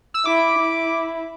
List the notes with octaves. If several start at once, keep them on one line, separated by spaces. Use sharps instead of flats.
E6
E4 D6
E4